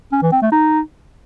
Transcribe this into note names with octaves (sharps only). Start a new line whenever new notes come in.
C#4
E3
C4
A3
D#4